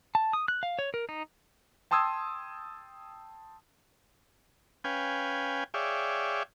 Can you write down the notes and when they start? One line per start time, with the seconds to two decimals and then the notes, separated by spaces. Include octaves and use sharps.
0.15 A5
0.33 D#6
0.48 F#6
0.63 F5
0.79 C#5
0.94 A#4
1.09 D#4
1.91 G5 A5 C6 D#6 E6 G#6
4.84 C#4 B4 F5 G5 G#5
5.74 G#4 C#5 D5 E5 F5 G5